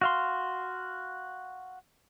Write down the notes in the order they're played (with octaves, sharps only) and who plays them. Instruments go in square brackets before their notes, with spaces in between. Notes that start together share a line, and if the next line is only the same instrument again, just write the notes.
[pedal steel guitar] F#4 F5 C6